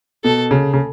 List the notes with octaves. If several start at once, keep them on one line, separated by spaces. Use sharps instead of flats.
B2 A4
C#3
C#3